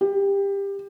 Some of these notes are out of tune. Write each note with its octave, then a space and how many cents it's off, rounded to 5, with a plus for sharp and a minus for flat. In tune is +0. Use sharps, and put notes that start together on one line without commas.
G4 +20